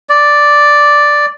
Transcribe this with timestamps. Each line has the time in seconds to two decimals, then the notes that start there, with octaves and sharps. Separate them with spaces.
0.09 D5